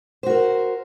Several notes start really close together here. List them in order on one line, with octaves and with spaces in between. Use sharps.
C5 F#4 A#4